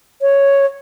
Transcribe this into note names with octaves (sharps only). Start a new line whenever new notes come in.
C#5